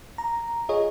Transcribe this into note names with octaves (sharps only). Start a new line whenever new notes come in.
A#5
F4 G#4 C#5 D#5